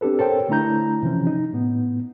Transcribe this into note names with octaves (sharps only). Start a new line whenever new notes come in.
C4 D4 G4 A4 B4
A4 A#4 C5 C#5 G5
D3 A3 D4 E4 A#5 G6
C3 E3 F3 C#4
D#4
A2 B3